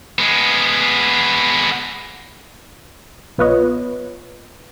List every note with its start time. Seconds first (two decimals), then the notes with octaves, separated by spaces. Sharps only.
0.19 G#3 B3
3.38 B1 B3 F4 B4 C#5 D#5